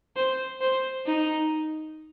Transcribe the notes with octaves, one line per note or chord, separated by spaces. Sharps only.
C5
C5
D#4